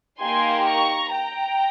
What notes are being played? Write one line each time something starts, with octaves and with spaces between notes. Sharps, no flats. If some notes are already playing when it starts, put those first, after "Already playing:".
A#3 D#4 G4 G#5 C6
A#5 C#6
G5 A#5